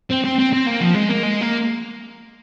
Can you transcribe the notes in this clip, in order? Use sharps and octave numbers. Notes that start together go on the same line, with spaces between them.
C4
C4
C4
C4
A#3
F3
G#3
A#3
G#3
A#3